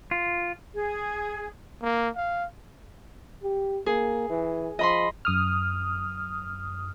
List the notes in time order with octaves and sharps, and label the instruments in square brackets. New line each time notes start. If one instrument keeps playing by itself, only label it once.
[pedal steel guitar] F4
[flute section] G#4
[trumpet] A#3
F5
[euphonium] G4
[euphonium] A#3 [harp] G#4
[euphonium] E3
[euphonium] F3 [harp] D#5 B5 C6
[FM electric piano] F#2 D#6 F6